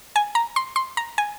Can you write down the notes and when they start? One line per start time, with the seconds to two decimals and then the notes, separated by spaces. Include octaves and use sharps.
0.16 G#5
0.35 A#5
0.56 C6
0.76 C6
0.97 A#5
1.18 G#5